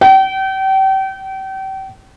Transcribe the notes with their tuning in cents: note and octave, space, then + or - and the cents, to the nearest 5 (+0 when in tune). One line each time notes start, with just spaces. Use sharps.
G5 -35